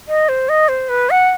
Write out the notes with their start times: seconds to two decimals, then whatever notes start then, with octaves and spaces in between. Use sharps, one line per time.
0.08 D#5
0.29 C5
0.49 D#5
0.68 C5
0.89 B4
1.10 F#5